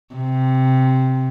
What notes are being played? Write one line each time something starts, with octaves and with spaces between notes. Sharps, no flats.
C3